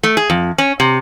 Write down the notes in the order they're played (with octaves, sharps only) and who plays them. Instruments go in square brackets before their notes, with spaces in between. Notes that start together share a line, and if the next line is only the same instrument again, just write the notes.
[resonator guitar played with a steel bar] A3
G#4
F2
C#4
C3